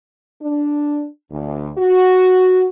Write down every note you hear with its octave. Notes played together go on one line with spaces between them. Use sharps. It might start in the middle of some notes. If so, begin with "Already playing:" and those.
D4
D2
F#4